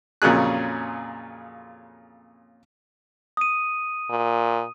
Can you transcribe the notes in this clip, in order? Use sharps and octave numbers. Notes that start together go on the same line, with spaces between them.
F2 A#2 C#3 F#3 G#4 F#6
D#6 D#7
A#2